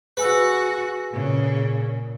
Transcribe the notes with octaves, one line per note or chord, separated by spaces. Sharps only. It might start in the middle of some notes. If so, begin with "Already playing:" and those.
F#4 G#4 B4 G#5 B5 E6
A#2 C#3